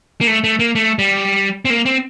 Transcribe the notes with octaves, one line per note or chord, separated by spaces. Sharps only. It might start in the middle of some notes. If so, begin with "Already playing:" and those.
A#3
A3
A3
A#3
A3
G3
C4
A#3
C4